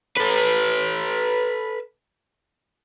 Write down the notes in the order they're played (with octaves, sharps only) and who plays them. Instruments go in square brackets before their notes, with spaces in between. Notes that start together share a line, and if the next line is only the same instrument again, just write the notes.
[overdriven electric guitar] A4 B4